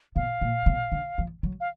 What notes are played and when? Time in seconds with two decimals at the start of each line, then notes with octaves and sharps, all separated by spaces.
0.16 B2 F5
0.41 A#2
0.66 B2
0.92 D3
1.18 F3
1.43 F#3
1.60 F5